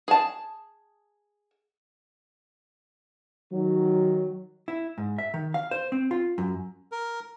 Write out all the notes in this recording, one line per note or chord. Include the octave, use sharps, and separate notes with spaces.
G#4 A5
D#3 F#3
E4
G#2
E5
D#3
F5
C5
C4
F4
F#2
A#4